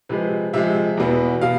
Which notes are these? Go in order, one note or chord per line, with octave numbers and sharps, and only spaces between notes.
C3 F3 G#3 B4
C3 F3 G#3 E5
E2 B2 B3
B2 F5